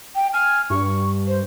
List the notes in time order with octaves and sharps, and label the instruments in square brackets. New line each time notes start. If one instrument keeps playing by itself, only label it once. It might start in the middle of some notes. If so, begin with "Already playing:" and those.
[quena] G5
[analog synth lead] G#5 [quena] F6
[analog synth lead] G2 [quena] C#6
[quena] C5